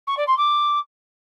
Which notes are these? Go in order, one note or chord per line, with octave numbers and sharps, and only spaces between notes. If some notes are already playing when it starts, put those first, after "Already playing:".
C#6
D5
C6
D6